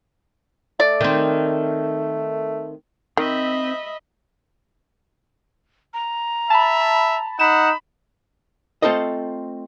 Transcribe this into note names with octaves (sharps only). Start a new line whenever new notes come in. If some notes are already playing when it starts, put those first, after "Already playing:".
A3 D5
D#3 C4
D#3 C4 D#5 E5 B5
A#5
E5 A5 B5
D#4 F#5 B5 E7
A3 C4 F4 A4 C5 D#5